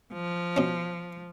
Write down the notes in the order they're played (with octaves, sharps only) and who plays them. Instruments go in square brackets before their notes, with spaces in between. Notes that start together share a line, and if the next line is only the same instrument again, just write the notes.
[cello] F3
[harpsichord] B2 C#4